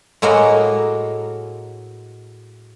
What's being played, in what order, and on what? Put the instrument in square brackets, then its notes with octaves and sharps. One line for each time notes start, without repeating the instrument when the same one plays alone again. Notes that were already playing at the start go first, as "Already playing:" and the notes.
[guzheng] A2 G#3 A#3 F#4 D#5